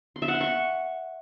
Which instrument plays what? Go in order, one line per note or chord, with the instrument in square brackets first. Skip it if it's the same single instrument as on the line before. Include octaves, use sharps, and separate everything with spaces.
[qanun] C6
E5
F#5
C6
C#6